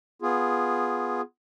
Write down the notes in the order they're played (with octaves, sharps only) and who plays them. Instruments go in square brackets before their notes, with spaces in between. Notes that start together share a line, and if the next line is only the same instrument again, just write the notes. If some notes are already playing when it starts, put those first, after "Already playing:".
[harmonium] B3 F4 G#4